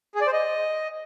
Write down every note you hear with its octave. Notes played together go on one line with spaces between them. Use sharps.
G#4
D5
C5
D#5